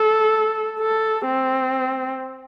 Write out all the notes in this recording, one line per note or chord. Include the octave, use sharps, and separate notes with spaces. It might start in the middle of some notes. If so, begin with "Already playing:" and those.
Already playing: A4
A4
C4